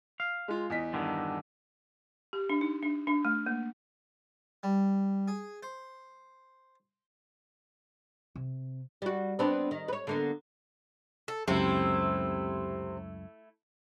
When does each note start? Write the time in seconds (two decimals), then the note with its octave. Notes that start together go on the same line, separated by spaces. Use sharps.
0.20 F5
0.48 G#3 F4
0.70 E2 D#5 B6
0.93 G2 D3 D#3
2.33 G4
2.50 D4
2.61 D#4
2.83 D4
3.07 D4
3.25 A3
3.46 A#3
4.63 G3
5.28 G#4
5.63 C5
8.35 C3
9.02 G3 F#4
9.39 B3 C4 D4
9.71 D#3
9.88 B4 C#5
10.07 D3 A#3 B3
11.28 A4
11.48 C#2 F#2 C3 A3 C4 E4